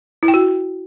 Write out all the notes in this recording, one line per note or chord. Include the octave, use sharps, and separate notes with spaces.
E4
G5
F#4